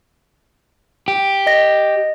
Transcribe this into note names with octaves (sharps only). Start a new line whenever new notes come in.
G4
D#5 A#6